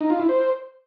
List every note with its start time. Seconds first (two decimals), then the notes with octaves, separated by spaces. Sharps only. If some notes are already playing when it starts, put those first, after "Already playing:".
0.01 D#4
0.10 F4
0.20 E4
0.29 C5